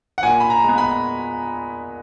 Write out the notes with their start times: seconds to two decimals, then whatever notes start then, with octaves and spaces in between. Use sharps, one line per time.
0.18 F#5
0.23 A#2 G#5
0.40 B5
0.50 A#5
0.64 G#3 B3
0.78 B5